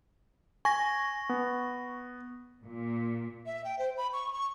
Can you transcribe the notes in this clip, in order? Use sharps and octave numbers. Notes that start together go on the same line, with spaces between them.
G#5 C#6 A#6
B3
A#2
E5
G5
C5
B5
C#6
C#6